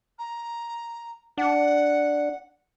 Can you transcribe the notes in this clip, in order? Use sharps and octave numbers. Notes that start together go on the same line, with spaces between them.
A#5
D4 F#5